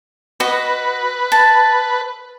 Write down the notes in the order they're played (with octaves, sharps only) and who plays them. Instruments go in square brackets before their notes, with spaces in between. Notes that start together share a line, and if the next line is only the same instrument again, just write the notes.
[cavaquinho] F#4 D#5 [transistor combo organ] B4
[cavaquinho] A5